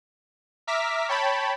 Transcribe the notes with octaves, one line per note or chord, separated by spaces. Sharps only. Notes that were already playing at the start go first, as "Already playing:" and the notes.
E5 A#5 D6 F6 B6
C#5 G5 A5 B5